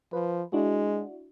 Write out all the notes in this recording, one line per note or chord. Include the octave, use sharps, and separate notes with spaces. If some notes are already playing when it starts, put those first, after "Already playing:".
F3 B4
G#3 D4 E4 F#4